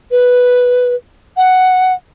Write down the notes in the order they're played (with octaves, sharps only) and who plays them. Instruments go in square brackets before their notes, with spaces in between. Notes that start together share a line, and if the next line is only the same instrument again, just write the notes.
[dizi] B4
F#5